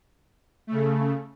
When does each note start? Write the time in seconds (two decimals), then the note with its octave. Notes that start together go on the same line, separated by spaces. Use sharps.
0.67 C#3 A3